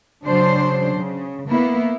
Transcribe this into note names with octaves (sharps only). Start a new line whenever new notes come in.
C#3 F#3 D4 C5
C#3
A#3 B3 E4